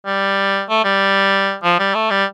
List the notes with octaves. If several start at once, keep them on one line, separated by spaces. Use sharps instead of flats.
G3
A3
G3
F3
G3
A3
G3